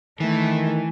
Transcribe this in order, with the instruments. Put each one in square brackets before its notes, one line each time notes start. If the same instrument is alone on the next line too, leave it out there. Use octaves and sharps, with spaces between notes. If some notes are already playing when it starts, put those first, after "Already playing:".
[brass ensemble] D#3 [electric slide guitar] E3 [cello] A3